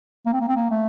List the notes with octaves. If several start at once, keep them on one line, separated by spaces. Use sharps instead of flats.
A#3
C4
A#3
C4
A#3
A3